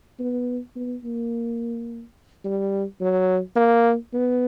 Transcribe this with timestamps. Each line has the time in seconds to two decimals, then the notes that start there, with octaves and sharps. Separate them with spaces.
0.19 B3
0.76 B3
1.04 A#3
2.45 G3
3.01 F#3
3.56 A#3
4.13 B3